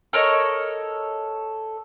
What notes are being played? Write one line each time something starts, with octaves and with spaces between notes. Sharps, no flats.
A4 A#4 C#5 D#5